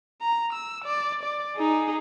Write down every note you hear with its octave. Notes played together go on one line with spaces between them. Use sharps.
A#5
E6
D5
D5
D#4 G#4